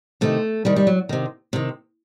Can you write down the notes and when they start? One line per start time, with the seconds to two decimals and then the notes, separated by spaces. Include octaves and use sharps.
0.21 C3 D#3 A3
0.65 C3 D#3 G3
0.76 G3
0.87 F#3
1.09 C3 D#3
1.53 C3 D#3